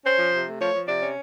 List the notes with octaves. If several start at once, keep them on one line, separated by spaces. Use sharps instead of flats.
C#4 C5
F3
C3
A3
F3 C#5
F3
C3 D5
C#4